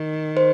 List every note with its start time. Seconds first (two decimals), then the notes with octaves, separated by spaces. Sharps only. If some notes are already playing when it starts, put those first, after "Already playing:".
Already playing: D#3
0.37 C5